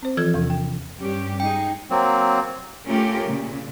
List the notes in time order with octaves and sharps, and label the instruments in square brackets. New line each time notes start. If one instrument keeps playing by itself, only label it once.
[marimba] C4 C5
E3 F3 F4 A4 G#6
E2 C3
G5
[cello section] G2 C#4 G4
[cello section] G#3 D#4 G#4 [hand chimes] G5
[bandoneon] F#3 A#3 C4
[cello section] A3 C#4 F4 G4 A#4
A#2 C#3